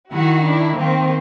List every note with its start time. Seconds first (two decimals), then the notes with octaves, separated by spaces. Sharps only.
0.12 D#3 E4 F#4
0.44 D4 E4
0.77 D#3 A#3 C4